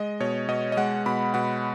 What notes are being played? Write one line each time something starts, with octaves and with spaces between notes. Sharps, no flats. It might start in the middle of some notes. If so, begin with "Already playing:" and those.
Already playing: G#3 D#5
B2 C#5
B2 D#5
D#5
G#3 F#5
B2 B5
B2 F#5